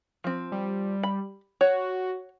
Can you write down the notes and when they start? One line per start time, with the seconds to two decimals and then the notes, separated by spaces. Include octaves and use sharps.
0.24 F3 C4
0.52 G3
1.03 B5
1.61 F#4 C#5